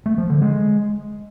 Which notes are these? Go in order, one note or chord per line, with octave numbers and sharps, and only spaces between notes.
A3
F3
D3
G#3